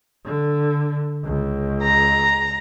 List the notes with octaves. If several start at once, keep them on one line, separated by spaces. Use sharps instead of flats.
D3
C#2
A#5